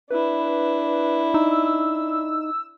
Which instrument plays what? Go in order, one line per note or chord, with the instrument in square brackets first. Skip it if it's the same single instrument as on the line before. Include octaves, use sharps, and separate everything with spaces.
[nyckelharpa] D4 E4 [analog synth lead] B4
[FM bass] D#4 [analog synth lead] E6